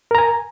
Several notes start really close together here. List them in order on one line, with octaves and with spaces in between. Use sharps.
A#4 A#5 G#5